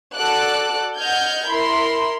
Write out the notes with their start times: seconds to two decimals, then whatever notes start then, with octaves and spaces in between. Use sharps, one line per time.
0.15 F#4 A4 D5 F#5 D6 F#6
0.97 D#5 F#5 F6 G6 G#6
1.48 E4 A#4 B5 C6